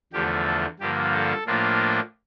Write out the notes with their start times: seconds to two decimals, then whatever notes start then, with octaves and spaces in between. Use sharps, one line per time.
0.13 E2 D3 F3 A3 G4
0.46 A4
0.80 G2 D3 F3 A#3 G4
1.13 A4
1.46 A2 F3 A#3 D4 F4